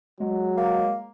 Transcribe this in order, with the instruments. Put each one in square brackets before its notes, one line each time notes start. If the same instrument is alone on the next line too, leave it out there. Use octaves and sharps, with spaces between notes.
[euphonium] F#3 [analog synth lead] G#3
[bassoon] A#3